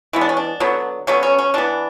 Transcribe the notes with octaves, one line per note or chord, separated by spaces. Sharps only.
E3 G#3 B3 E4
D4
C#4
D4
D3 F#3 B3
D3 F#3 B3 C#4
C#4
C#4
E3 B3 D4